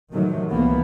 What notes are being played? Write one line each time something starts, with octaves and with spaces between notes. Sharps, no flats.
C3 D#3 E3 F#3 A3
C2 E3 F3 A#3 B3